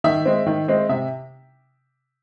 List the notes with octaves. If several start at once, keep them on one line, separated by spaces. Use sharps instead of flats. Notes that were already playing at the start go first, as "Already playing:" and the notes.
D#3 E5
G#3 C4
D#3
G#3 C4
C3 E5